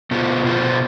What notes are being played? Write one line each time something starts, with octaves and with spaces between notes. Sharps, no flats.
B2 B3 F4 C5
B2 B3 F4 C5